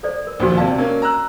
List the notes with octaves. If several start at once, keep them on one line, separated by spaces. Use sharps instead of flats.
A4 C5 D5
A#4
A#1 D#2 F#4 C5 G#5
C3 D5 F5 A5
A#3 C#4 A#4
A#5 E6 F#6